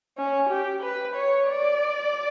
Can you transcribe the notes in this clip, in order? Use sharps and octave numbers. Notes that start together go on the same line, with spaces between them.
C#4
G4
B4
C#5
D5